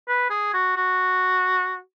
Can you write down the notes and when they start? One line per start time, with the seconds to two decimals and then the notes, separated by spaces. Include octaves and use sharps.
0.08 B4
0.30 G#4
0.53 F#4
0.76 F#4